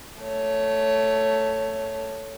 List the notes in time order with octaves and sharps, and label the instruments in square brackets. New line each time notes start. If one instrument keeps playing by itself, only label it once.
[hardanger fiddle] A3 C#5